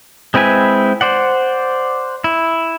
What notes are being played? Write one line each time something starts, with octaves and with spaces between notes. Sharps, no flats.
G#3 C4 E4 B4 G#5
C5 D5 F#5
E4